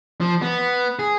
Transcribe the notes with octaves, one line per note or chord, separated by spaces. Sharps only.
F3
B3
G#4